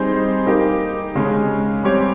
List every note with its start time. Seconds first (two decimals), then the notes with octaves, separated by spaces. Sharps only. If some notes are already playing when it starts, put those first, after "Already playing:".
Already playing: G3 C4 D#4 G#4 C5
0.46 A#3 D#4 G4
1.15 C#3 G#3 C#4 G#4
1.83 G3 C4 G4 C#5